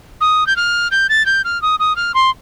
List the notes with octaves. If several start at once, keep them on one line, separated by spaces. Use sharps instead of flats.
D#6
G6
F6
G6
A6
G6
F6
D#6
D#6
F6
C6